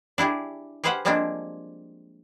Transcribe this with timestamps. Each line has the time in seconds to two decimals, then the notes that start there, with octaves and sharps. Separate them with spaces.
0.18 D4 E4 G4 G#4
0.84 G4 G#4 B4 C5 F5 F#5
1.05 F3 G3 G#3 A#3 C4 D4